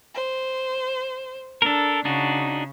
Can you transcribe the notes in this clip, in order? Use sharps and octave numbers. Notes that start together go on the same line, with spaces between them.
C5
D4 A4 A#4
C#3 D4 D#4 F#4